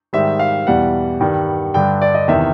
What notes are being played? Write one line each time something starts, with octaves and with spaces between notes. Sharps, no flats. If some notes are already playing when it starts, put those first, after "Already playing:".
G#2 D#3 G3 E5
F5
E2 B2 G3 F#5
G2 D#3 G3
G2 D3 G3 G5
D5
D#5
E2 C3 D#3 E5